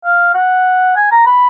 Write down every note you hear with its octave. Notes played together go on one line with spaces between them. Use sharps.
F5
F#5
G#5
A#5
B5